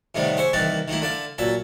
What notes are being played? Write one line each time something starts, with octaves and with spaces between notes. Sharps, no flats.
A2 C3 D#3 G3 A3 B3
G#4 C5 E5 C#6
C2 D#3 E3 A#3 B4 A5
D#3 A3 A#3 E4
D3 E4 D5 F5
A#2 F#3 E5 A5